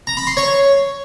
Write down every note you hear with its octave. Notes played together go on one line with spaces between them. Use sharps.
A#5
B5
C6
C#5